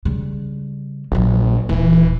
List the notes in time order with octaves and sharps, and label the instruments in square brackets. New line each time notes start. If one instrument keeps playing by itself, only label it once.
[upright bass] C#3 G3
[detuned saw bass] A#1 [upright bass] A#2 F#3
[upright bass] D#1 D#2 [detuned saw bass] E3